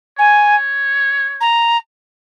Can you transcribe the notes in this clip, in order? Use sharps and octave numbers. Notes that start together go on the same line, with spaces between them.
C#5 G#5
A#5